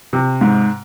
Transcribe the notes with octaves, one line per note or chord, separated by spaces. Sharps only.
C3
G#2